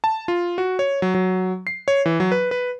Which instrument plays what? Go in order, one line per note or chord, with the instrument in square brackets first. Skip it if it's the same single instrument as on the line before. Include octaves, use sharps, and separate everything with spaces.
[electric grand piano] A5
F4
F#4
C#5
F#3
F#3
C7
C#5
E3
F#3
B4
B4